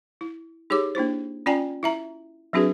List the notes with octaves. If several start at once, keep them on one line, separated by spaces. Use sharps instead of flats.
E4
D#4 G4 G#4 C#5 D6
A#3 D4 E4 C5
C#4 F4 D5 G5 G#5 A#5
E4 E5 A#5
F#3 C4 D4 F#4 G#4 B4